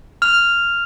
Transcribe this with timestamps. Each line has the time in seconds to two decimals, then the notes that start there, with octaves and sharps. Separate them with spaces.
0.22 F6 F7